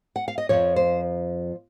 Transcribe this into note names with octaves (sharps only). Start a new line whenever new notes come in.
F#5
F5
D#5
F2 C#3 F3 C#5
C5